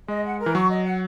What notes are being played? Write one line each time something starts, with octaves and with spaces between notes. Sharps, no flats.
G#3 D#5
F#5
A#4
E3
F#3 C#6
D#5
F#5